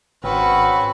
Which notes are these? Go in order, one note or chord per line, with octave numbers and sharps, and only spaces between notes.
G#1 G#2 C4 C#4 F#4 B4